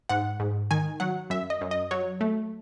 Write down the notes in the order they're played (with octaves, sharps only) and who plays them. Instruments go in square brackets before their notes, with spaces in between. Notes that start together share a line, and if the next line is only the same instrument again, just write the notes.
[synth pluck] G#2 F#5
G#2
D#3 G#5
F#3 F#5
F#2 E5
D#5
F#2
D#5
F#3 C#5
A3